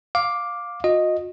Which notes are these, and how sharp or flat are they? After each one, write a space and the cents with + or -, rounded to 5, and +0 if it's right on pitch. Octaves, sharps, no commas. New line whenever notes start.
F5 +10 D6 +0
F#4 -45 D#5 +0